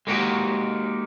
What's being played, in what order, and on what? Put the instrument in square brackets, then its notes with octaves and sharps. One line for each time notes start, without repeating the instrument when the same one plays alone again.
[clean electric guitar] G#3 A#3 D#4 F#4 G4